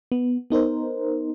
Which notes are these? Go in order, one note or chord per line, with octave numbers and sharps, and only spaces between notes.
B3
B3 D#4 A#4 C5